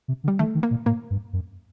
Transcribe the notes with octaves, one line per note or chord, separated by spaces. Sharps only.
C3
D3
G3
D#3 A3
D#3
A#3
A#2
A2 A#3
G2
F#2